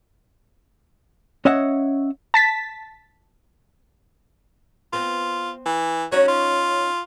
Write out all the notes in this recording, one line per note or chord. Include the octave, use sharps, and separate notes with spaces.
C#4 C#5 D#5 E5 F#5
A5 A6 B6
B3 C4 F4
E3
F#3 C#4 D#4 C#5
F4